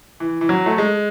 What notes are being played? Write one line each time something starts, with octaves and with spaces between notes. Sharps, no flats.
E3
E3
F#3
A3
G#3